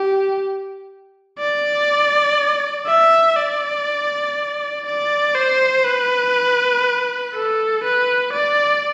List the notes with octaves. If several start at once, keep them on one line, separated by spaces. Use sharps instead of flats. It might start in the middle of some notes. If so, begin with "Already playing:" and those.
Already playing: G4
D5
E5
D5
D5
C5
B4
A4
B4
D5